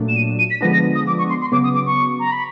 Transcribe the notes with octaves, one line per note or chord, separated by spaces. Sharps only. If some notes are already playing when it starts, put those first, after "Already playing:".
Already playing: A#2 F#3 A3 D4
E7
D#7
D#7
B6
D3 F3 G#3 B3 D4 A#6
A#6
D#6
D6
C#6
C6
C6
C#3 F#3 B3 D6
D#6
D6
C#6
A#5
B5